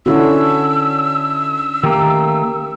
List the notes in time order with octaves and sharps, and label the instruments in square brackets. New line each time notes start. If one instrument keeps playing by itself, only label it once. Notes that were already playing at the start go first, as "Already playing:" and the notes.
[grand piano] D3 E4 A4 [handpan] C#4 D4 F#4 [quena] E6
[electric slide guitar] D#3 A3 A#3 [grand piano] G4